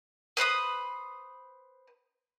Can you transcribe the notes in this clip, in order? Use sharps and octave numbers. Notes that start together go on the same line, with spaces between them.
B4 C5 B5 D#6